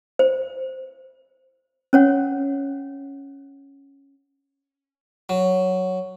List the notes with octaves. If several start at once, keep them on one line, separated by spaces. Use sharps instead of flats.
C5
C#4 C#5 F#5
F#3